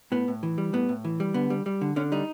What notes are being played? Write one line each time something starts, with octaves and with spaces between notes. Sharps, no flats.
A2 B3
A2
E3
G3
A2 B3
A2
E3
G3
D3 B3
G3
G3
D3
D3 C#4
G3 D#4